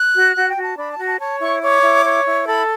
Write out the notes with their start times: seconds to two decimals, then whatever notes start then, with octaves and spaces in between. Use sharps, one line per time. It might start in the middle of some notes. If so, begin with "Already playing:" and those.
Already playing: F#6
0.14 F#4
0.36 F#4 F#5
0.50 G5
0.56 F#4
0.63 A5
0.77 D4 B5
0.91 A5
0.99 F#4
1.06 A5
1.20 C#5 A5
1.41 E4 C#6
1.62 C#5 D6
1.83 E4
2.05 C#5
2.26 E4
2.47 A4 B5